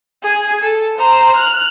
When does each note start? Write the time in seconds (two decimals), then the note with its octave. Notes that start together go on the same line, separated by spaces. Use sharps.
0.23 G#4 G#5
0.63 A4
0.98 C5 A#5
1.36 F6 F#6